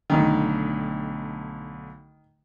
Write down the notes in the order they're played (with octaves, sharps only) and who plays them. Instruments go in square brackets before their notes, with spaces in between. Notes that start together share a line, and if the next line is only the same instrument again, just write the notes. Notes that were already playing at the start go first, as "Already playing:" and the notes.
[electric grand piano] B1 D3 A3 [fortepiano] D#3